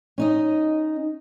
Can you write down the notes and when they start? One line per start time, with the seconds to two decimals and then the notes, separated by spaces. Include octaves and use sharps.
0.18 C#4 D#4 D#5